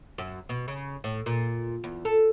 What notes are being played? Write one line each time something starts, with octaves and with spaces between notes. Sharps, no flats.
F#2
B2
C#3
A2
A#2
E2
A4